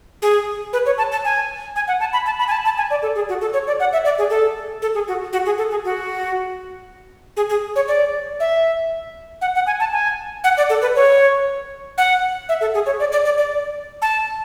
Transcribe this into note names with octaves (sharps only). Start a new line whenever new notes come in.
G#4
B4
C#5
A5
A5
G#5
G#5
F#5
A5
B5
A5
B5
G#5
A5
A5
G#5
D5
A4
G#4
F#4
A4
C#5
D5
F#5
E5
D5
G#4
A4
A4
G#4
F#4
F#4
G#4
A4
G#4
F#4
G#4
G#4
C#5
D5
E5
F#5
F#5
G#5
A5
G#5
F#5
D5
A4
B4
C#5
F#5
E5
A4
G#4
C#5
D5
D5
D5
D5
A5